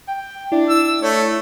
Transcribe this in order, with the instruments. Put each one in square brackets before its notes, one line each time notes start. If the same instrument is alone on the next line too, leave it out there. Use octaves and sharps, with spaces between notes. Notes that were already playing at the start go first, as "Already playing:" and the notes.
[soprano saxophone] G5
[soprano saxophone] D4 [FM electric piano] E4
[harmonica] E6
[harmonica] A3 [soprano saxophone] C#5